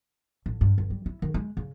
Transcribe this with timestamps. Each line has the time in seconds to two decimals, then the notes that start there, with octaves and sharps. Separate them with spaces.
0.46 A1
0.61 G2
0.78 G1
0.90 G3
1.06 E4
1.22 D#3
1.34 G#3
1.57 C#3